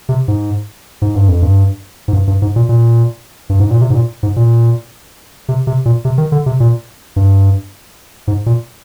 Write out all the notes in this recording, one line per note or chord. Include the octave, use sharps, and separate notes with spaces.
C3
G#2
G#2
G2
F2
G2
G#2
G2
G2
G#2
A#2
A#2
G2
G#2
A#2
C3
G#2
A#2
G#2
A#2
C3
C3
A#2
C3
D#3
D3
C3
A#2
G2
G#2
A#2